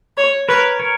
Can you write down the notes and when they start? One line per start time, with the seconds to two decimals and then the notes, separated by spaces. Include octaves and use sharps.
0.17 C#5
0.48 A#4 B4 C#5
0.80 A#4 C#5